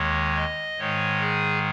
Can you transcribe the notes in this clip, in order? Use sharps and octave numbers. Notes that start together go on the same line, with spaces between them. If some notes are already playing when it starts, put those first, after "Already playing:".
Already playing: D#2 D#3 G#3 C#5
D#5
G#2 D#3 G#3 C#5
G#4